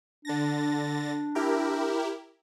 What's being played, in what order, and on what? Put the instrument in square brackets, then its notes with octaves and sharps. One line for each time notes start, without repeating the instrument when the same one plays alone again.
[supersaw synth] D3 A6 A#6 [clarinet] D4
[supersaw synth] E4 G4 A#4